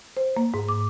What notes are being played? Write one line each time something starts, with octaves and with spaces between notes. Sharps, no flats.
C5
A#3
G#2
D6